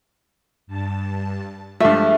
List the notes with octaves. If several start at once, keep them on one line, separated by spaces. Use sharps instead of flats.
G2 A5
G2 F3 G#3 A3 E5